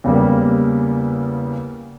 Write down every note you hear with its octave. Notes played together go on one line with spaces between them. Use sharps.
E2 C#3 G3 A#3